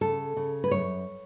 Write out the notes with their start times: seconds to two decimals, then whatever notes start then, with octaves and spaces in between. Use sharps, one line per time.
0.01 C#3 A4
0.37 C#3
0.64 B4
0.71 F#2 C#5